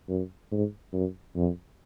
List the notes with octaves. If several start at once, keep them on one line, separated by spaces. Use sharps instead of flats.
F#2
G#2
F#2
F2